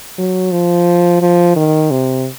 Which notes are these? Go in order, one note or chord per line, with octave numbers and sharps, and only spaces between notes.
F#3
F3
F3
D#3
C3